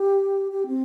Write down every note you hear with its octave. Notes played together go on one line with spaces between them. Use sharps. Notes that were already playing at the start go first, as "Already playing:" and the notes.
Already playing: G4
G4
C4